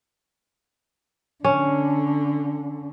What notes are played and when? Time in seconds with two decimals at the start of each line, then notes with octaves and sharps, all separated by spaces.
1.44 D3 C#4